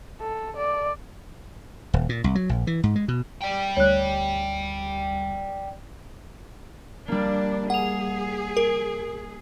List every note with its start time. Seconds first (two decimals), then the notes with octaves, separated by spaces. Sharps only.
0.21 A4
0.57 D5
1.94 D#1
2.09 A#2
2.24 C2
2.35 F#3
2.49 A#1
2.67 E3
2.84 G#2
2.96 G#3
3.08 B2
3.42 D5 G5
3.77 D2 G3 C#5 F#6
7.08 G3 A#3 D4
7.70 G#4 F#5 F7
8.57 A#4